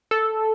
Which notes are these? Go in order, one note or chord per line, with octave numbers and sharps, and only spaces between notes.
A4